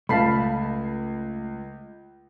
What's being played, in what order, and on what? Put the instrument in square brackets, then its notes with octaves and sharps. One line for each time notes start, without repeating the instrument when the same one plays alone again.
[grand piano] C#2 C7 [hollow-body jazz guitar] A3 [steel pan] F5 A5 B5